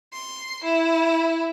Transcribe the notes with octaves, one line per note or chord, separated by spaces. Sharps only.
C6
E4